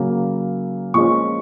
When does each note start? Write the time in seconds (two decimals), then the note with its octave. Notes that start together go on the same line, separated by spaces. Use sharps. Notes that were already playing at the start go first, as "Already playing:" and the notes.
Already playing: C#3 F#3 A#3
0.94 A#2 F3 G#3 C#4 C#6